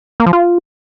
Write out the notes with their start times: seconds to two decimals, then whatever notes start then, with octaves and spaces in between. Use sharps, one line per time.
0.20 A#3
0.26 F3
0.33 F4